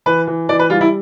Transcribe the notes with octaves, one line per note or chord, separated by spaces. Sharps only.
E3 B4
E3
E3 D5
B4
G3 F4
E4